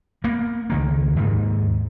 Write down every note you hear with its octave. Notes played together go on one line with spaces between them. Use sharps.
A#3 B3
C#2 D#3 A#3
D#2 G#2